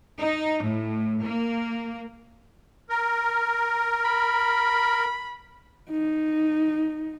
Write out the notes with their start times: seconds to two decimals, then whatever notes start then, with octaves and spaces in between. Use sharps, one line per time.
0.19 D#4
0.63 A2
1.23 A#3
2.89 A#4
4.05 B5
5.91 D#4